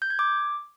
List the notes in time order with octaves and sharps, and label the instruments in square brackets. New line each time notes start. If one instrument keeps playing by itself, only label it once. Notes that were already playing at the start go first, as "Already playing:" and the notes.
[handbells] G6
G#6
D6